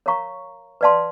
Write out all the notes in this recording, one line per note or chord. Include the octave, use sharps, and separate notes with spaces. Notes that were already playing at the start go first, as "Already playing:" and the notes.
A#4 C#5 F5 A#5 C#6
B4 D5 F5 A5 C6